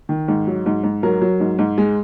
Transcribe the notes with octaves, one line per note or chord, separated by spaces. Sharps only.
D#3
G#2
F#3
G#2
G#2
F#3 A#4
F#3
G#2
G#2
G#3